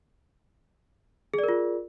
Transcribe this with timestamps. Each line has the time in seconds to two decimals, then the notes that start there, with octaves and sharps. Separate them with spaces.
1.34 G#4
1.39 D5
1.44 A#4
1.48 F4